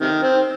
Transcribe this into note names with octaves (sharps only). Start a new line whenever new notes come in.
C3 D#3
C4